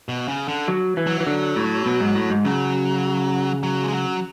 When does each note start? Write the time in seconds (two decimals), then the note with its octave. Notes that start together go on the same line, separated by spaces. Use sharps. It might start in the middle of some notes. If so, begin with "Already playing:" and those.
0.09 B2
0.28 C#3
0.48 D3
0.68 F#3
0.97 E3
1.07 F#3
1.20 E3
1.27 D3
1.56 A2
1.86 B2
2.01 G#2
2.15 A2
2.30 G#2
2.45 C#3 F#3
3.63 F#3
3.83 G#3
3.92 F#3